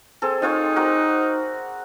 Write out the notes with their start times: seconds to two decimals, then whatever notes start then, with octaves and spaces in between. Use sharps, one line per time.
0.22 C4 G#4 A4
0.42 C4 D#4 F4 C#5
0.76 F#4 A#4 D5